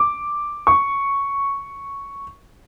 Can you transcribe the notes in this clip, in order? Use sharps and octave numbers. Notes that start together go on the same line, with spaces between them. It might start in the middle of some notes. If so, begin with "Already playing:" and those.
Already playing: D6
C#6